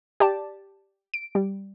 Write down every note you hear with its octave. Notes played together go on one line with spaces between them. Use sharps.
G4 D5 A5
D7
G3